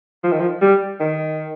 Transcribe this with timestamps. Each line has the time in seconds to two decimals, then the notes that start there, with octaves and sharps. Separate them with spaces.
0.24 F3
0.32 D#3
0.40 F3
0.61 G3
1.00 D#3